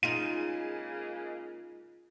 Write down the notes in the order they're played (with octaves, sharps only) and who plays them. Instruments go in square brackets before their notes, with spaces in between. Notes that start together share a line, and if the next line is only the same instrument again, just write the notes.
[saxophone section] C#3 G#3 A#3 [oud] D#4 F4 [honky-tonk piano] D#7